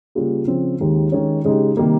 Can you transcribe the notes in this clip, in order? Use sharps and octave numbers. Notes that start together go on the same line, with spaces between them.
C#3 G3 A#3 F4 G#4
C#3 F3 C4
D#2 D#3 G#3
D#3 G#3 C#4
C#3 G#3 D#4 G4
C3 D#3 G3 A#3